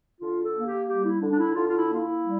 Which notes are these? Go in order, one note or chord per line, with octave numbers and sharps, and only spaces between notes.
D3 F4
A4
A#3
G4
G3 G4
E4
D3 D4
D4
E4
D3 F4
F4
E4
A#3
F4
E4
G3